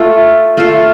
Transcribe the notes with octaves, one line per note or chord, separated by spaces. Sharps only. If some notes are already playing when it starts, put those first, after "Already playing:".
Already playing: A3 F4 A4
A3 F4 A4